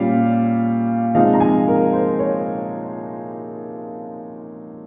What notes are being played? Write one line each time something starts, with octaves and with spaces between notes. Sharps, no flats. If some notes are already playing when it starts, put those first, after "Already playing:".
Already playing: A#2 G3 C#4 F5
C3 F3 G#3 D#4 F5
A#5
G#5
A#4
C5
C#5